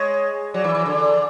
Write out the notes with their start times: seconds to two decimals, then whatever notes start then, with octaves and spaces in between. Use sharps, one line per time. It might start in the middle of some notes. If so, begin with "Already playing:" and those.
Already playing: G#3 C#5
0.54 F#3 D5
0.64 E3
0.75 E3
0.86 D3
0.96 D5